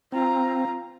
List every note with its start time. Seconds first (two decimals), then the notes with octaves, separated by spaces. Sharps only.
0.12 C4 F4 A#5